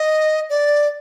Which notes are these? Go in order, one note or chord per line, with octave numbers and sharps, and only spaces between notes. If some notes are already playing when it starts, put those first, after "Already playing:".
Already playing: D#5
D5